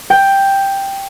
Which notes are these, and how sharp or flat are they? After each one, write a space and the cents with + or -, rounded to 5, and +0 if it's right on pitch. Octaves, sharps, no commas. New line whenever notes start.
G5 +5